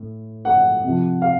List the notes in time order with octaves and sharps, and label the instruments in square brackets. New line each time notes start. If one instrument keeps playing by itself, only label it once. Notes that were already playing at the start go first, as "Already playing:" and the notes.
Already playing: [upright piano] A2
F#5
C3 F3
F5